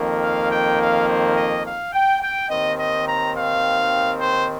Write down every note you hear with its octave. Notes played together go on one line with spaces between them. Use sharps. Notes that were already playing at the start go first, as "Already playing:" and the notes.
Already playing: F2 D#3 A#3
F5
G5
F5
C5
D#5
F5
G5
G5
D#2 D#3 C4 D#5
D#5
A#5
F5
C5